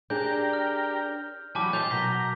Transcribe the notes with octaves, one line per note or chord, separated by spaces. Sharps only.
D4 G4 G#4 A#4 D5 G6
F6
E3 F#3 G3 G4 G#5 A5 B5 D6
D5 D#5 G5 A5 C6 G6 F7
B2 F#3 A#4 B6 G7